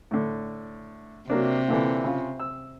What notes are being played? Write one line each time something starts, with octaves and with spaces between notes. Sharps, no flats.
A2 D3
C3 F#3 A#3 D4
A#2 D3 E3
C#3 F4
E6